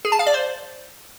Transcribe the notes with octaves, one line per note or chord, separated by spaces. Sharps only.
G#4
A5
F5
D5
C5